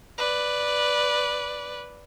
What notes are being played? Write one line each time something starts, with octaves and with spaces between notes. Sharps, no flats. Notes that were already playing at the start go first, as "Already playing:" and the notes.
B4 D5